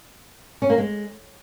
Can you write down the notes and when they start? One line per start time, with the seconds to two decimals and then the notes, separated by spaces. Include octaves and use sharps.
0.62 C#4
0.70 A#3
0.78 G#3